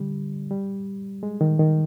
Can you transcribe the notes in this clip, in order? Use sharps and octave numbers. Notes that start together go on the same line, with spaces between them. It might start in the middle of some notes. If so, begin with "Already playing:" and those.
Already playing: D3 G3
G3
G#3
D#3
D#3